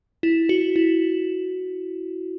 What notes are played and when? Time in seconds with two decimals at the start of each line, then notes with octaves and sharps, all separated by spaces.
0.23 E4
0.49 F#4
0.76 E4